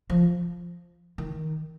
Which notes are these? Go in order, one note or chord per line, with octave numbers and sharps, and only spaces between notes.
F3
D#3